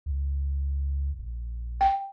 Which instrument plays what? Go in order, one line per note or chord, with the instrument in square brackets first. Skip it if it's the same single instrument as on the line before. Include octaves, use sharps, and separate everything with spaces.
[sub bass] C#2
A#1
[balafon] G5